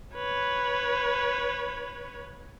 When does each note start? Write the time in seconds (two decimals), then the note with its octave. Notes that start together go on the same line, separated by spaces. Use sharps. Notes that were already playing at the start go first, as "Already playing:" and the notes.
0.14 B4 C#5